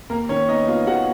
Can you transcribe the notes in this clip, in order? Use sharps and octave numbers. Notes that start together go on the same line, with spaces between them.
D#2 A#3 A#4
D#3 C#4 C#5
B3 D#4 D#5
B3 F4 F5
D#2 F#4 F#5